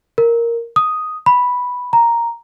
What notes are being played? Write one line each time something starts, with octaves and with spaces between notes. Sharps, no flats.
A#4
D#6
B5
A#5